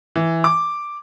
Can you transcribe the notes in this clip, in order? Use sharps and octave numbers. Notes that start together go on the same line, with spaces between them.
E3
D6